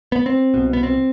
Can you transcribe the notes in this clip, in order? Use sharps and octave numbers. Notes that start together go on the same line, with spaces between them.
B3
C4
C2 B2
B3
C4